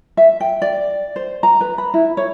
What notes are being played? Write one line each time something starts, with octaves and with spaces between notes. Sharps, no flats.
E5
G5
D5
C5
A#5
B4
B5
E4
C#5